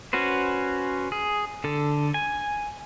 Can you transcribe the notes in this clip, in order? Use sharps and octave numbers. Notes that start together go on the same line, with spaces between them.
C#4 F#4 B4 C5
G#4
D3 A4
G#5